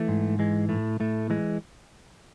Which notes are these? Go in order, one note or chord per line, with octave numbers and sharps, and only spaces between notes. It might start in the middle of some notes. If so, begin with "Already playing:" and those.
Already playing: E3 A3
G#2
E3 G#3
A2 A3
A2 A3
E3 G#3